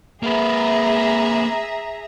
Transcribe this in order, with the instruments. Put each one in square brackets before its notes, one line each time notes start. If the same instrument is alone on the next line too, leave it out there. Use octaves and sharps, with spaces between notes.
[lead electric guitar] A#3 B4 [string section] G#4 E5 A#5